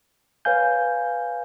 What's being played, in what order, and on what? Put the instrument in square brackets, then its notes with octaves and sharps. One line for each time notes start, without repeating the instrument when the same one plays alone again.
[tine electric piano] B4 C#5 F5 G#5 G6